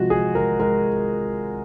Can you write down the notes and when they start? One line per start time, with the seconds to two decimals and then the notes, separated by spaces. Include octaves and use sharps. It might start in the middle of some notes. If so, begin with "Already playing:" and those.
Already playing: C3 F3 G#3 F#4
0.10 G#3 G#4
0.35 G#3 A#4
0.59 G#3 A#4